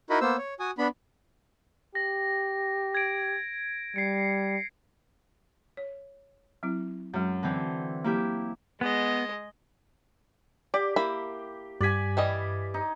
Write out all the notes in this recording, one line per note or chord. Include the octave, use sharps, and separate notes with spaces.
D#4 E4 F#4 A#4 D#5 B5
A#3 B3 C5 E6
C#5
F#4 G#5 D#6
B3 D4 B5
G4 A#6
G#6 D7
G3 C7 C#7
C#5
F#3 C4 E4
F#2 F#3 G#3
D3 E3 C4
F#3 A#3 E4 G4
G#3 B3 D#5
G4 D5
A#3 E4 B5
G2 G4 D5 G#5 B6
E3 G3 D#5
D#4